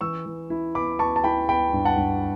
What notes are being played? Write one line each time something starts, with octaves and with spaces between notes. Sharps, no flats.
E3 C#6 E6
E3
E4
B3 B5 D6
B3 A5 C#6
A5
E4 G5 B5
B3 G5 B5
G2
F#5 A5
G2